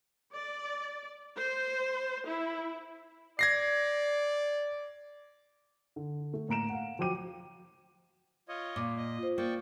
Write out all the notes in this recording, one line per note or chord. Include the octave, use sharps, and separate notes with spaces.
D5
C5
E4
D5 G#6 A#6 C7
D3
A3
A2 A#3 A#5 D7 E7
F5 F#5
F3 F#3 G5 D6 D#7
F4 C#5 D#5
A#2 D6
D#5
F4 C5
A#3 D5 G5 C#6